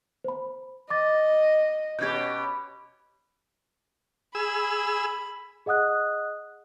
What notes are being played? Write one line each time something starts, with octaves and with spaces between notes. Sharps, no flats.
C5 B5
D#5 D6 A6
B2 C#4 G4 G6 G#6
G#4 B5 E6
G#4 D#5 F#5 D#6 F#6